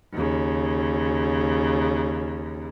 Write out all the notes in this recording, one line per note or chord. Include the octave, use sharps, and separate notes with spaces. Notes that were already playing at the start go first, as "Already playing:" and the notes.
D#2 C#3